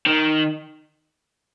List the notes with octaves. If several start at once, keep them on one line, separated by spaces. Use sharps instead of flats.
D#3